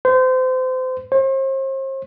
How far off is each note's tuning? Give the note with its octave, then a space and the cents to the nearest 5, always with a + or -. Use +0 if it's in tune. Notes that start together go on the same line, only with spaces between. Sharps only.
C5 -30
C5 +40